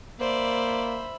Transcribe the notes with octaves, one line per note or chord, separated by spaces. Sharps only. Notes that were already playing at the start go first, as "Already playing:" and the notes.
A#3 C5 D5 E5 B5